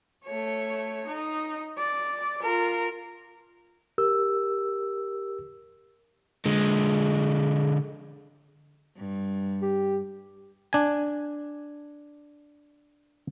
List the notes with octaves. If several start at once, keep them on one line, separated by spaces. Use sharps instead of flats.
A3 C#5
D#4
D5
F4 A#4
G4 A#4 E6
D3 G#3
G2
G4
D4 G#5